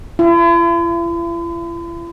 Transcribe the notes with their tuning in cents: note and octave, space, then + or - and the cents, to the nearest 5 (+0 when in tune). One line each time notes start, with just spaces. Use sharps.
E4 +45